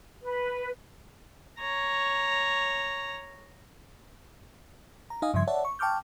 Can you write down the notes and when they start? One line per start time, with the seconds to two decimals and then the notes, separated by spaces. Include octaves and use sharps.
0.23 B4
1.60 C#5 A#5
5.10 A#5
5.22 D#4 D#5 F5 G#5 D#6
5.34 G2 C#3 F3 E5 C6 G#6
5.47 C#5 D5 E5 F#5 A5
5.65 C#6
5.79 G5 A5 C#6 D6 F6 G6